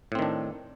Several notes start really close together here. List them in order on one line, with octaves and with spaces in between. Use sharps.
A2 C4 D#3 D4